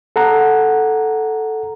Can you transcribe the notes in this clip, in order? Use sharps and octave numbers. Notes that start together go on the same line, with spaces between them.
A4 F#5 A#5